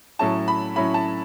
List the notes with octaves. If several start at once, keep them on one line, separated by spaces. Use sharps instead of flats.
A2 F#3 C#4 E4 A5
B5
A2 F#3 C#4 E4 B5
A5